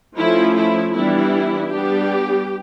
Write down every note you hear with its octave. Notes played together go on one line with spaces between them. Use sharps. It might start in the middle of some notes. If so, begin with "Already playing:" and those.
F3 A3 C#4 E4
E4
E3 G3 B3 D4 E4
G3 B3 D4 G4